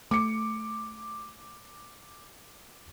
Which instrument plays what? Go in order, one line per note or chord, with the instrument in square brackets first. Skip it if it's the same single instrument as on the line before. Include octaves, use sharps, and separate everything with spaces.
[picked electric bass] A3 [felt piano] D6 C#7